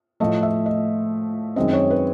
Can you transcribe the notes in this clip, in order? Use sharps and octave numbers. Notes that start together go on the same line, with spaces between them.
A2 F3 A3 D#5
E5
D#5
F#2 D#3 G#3 C4 D#5
C#5
B4